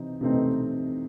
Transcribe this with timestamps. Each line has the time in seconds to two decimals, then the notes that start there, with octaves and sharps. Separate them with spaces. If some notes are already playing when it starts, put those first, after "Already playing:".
Already playing: C3 E3 C4 D#4
0.21 C3 E3 A3 C4 D#4